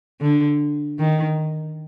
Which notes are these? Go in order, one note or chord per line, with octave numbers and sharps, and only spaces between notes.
D3
D#3